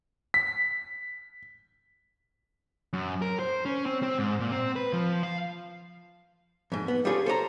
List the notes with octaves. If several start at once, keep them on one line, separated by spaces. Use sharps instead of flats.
B6
F#2
A#4
C5
C#4
C4
C4
G#2
A#2
C4
B4
F3
F5
F2 G#2
B3
G3 C#4 F4 G#4 A4
A4 C5 C#5 A#5